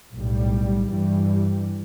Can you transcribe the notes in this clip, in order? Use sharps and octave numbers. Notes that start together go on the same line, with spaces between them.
B1 A2 G3
G2 E3 G3